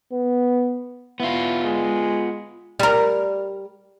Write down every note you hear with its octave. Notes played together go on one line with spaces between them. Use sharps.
B3
B3 E4 F4
G#3
G3 A#4